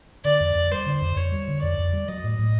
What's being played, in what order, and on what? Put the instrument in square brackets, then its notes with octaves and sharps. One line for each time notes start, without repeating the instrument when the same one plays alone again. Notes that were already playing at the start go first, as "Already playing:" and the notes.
[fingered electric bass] D3 [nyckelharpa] D5
[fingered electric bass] F2
F2
[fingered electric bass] G3 [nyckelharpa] C5
[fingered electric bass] D3
F2
[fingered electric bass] F2 [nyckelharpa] C#5
[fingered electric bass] G3
D3
[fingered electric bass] F2 [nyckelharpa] D5
[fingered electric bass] F2
G3
[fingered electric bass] F#3 [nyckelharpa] D#5
[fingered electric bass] A2
A2